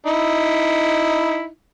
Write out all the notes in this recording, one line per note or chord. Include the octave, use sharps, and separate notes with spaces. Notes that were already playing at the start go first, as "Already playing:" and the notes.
D#4 E4